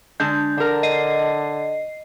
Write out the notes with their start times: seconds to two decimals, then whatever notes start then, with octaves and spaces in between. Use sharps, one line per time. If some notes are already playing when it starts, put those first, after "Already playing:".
0.20 D3 G#3 D4 G6
0.58 D3 D4 A#4
0.83 D#5 C7